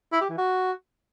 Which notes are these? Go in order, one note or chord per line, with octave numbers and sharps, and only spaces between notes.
E4
G4
E3
F#4